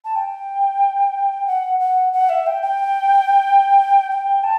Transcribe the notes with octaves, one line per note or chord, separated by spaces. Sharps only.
A5
G5
F#5
F#5
F#5
E5
G5
G5
G5
A5